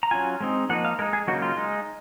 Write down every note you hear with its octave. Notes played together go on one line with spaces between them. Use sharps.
A#5
F#3 C#4 F4 G#5
G#3 C4 D#4
F3 A#3 D#4 F#5
F5
G#3 D#4 A#4
G#4
C#3 F#3 A#3 D#4 F#4
F4
G#3 D#4